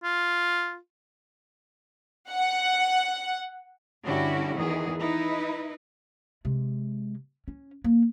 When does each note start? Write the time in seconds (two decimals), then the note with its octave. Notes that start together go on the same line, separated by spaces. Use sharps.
0.03 F4
2.31 F#5
4.05 G2 D3 C#4 E4 F#4 G4
4.57 E2 D#3 E3 G#4
5.00 D#4 E4 B4
6.45 C3 G#3
7.48 C#4
7.84 A#3